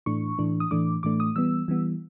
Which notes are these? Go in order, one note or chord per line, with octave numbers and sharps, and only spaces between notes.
A2 E3 A3 D4 C#6
A2 E3 A3 D4
D#6
A2 E3 A3 D4 D6
A2 E3 A3 D4 D6
D#6
E3 G3 B3 E6
E3 G3 B3